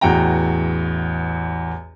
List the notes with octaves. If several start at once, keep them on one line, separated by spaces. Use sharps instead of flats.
A1 E2 F#4 G5 A#5